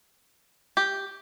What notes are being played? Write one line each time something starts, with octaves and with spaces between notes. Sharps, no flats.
G4